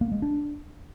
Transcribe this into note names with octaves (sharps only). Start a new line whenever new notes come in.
A#3
G#3
D4